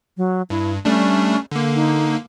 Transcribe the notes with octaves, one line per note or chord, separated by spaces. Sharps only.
F#3
G2 E4
G3 A3 C#4 D4
D3 A#3
D#4